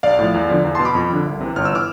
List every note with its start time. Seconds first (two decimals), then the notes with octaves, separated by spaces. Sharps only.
0.03 B1 D5 F5
0.19 A2 F3
0.34 E2
0.50 D3 F3
0.64 E2
0.75 A5 C6
0.80 B2
0.85 B5 D6
0.95 F2
1.10 D3 F3
1.25 C2
1.41 C3 E3
1.56 G1 F6
1.65 E6
1.73 E3 D6 F6